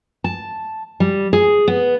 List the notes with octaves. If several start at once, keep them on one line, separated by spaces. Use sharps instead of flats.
A5
G3
G#4
B3